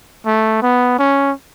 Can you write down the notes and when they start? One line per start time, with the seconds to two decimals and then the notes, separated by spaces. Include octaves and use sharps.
0.26 A3
0.62 B3
0.99 C#4